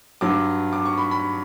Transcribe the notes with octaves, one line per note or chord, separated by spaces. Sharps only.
G2 F#3 D6
D6
C#6
B5
B5